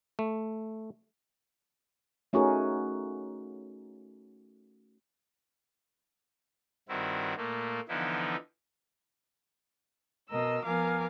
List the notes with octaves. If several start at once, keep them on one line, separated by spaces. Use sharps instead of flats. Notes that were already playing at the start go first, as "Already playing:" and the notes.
A3
A3 C#4 D#4 F#4 G#4 A#4
G2 D#3 C4 E4 F#4
A#2 A3 A#3
D3 E3 F3 B3 D#4 E4
B2 A#4 D#5 E6
F3 B3 A#4 F5 G#5 D6